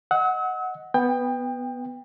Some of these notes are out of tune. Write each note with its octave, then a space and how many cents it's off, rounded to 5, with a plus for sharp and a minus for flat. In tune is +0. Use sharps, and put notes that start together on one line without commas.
D#5 +0 F#5 +0 E6 -45
B3 +0 G5 +25